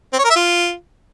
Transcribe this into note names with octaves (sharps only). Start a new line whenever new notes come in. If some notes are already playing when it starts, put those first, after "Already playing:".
C4
C#5
A#4
E5
F4